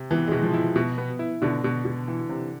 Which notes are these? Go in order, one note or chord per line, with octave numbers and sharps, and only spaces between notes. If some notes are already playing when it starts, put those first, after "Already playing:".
Already playing: C3
E3 B3
G#3
B2
F3
E4
B2
B3
E4
B2 D3
B2
B2
E3
C3